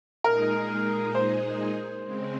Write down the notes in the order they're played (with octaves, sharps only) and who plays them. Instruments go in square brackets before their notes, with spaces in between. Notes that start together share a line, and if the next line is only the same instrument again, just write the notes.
[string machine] A#2 G#3 D#4 G#4 [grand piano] A#4
[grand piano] C5
[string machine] C#3 G#3 C4